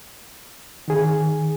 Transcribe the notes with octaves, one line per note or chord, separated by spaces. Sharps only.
D#3 G#4